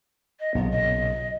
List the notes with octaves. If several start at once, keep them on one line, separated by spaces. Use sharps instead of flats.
D#5
B1 A#2 C#3 B3
D#5